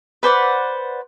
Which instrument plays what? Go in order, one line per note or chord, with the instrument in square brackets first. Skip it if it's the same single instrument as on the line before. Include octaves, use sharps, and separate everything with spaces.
[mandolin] B4 C5 D5 F#5